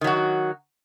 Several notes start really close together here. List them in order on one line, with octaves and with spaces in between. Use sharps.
D#3 F#3 F#4